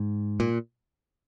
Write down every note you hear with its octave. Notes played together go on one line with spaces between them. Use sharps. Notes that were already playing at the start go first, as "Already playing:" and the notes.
Already playing: G#2
A#2